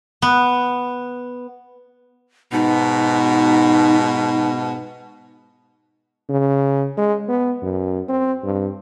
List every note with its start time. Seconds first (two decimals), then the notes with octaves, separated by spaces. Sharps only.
0.22 B3
2.52 G#2 B2 D#4
6.30 C#3
6.98 G#3
7.29 B3
7.63 F#2
8.09 C4
8.44 G2